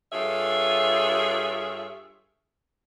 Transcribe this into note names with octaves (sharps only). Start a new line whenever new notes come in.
G2 F4 G#4 A4 C#5 E5